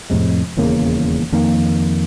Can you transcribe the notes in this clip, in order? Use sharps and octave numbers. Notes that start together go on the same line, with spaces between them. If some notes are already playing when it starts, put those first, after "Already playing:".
F2 A2 C3 G#3
D#1 E2 C#3 A#3
F2 D#3 A#3